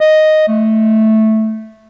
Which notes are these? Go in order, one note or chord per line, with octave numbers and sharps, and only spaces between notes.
D#5
A3